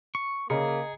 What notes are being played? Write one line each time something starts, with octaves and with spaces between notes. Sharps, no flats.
C#6
C#3 A#3 G#4 D#5 A#5 C#7